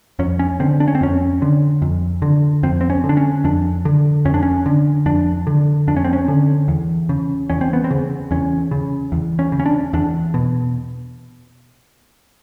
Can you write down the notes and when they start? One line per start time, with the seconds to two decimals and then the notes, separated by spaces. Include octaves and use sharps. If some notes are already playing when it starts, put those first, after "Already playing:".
0.19 F2 C#4
0.39 C#4
0.60 D3 C4
0.80 D4
0.88 C#4
0.95 C4
1.01 F2 C#4
1.42 D3
1.82 F2
2.22 D3
2.63 F2 C4
2.81 C4
2.90 C#4
3.04 D3
3.09 D4
3.17 C#4
3.44 F2 D4
3.85 D3
4.25 F2 C#4
4.34 D4
4.43 C#4
4.66 D3
5.06 F2 D4
5.47 D3
5.88 F2 D4
5.97 C#4
6.04 C4
6.13 C#4
6.28 D3
6.68 E2
7.09 C#3
7.50 E2 C#4
7.61 C4
7.73 B3
7.84 C4
7.91 C#3
8.31 E2 C#4
8.71 C#3
9.12 E2
9.39 C#4
9.52 C#3
9.60 C#4
9.66 D4
9.93 E2 D4
10.34 B2